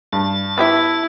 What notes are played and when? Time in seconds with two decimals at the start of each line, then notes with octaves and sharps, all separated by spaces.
0.13 G2 A5
0.58 B3 E4 G4 E5